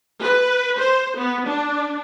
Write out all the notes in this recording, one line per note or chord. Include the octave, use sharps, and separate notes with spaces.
B4
C5
B3
D4